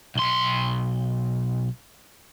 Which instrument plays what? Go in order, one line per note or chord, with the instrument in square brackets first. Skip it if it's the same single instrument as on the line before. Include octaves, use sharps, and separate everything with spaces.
[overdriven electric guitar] B1 C6